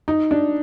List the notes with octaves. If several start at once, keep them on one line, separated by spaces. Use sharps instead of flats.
D#4
D4